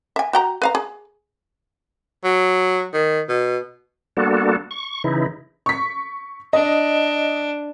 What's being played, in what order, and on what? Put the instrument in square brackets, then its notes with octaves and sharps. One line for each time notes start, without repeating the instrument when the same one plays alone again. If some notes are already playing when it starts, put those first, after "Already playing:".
[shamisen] E5 G#5
F#4 G5 A#5
B4 F5 A#5
G#4
[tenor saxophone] F#3
D#3
B2
[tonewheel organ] G3 A#3 B3 D4 F#4 A4
C#6
C#3 E3 D#4 E4
[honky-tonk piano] C#6 B6
[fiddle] D4 [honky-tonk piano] D#5